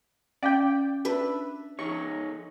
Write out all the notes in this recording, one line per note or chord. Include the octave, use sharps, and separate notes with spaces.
C#4 D5 F5 G5
D4 B4 E5
D#4 G#4 C#5 C#6